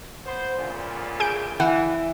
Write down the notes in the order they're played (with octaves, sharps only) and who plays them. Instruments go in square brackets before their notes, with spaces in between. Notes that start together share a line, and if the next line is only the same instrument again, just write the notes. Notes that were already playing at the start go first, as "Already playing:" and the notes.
[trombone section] B3 C5
D2 A#2 C#3
[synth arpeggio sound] G#4 G6 D7
[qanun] E3 [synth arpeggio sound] F#5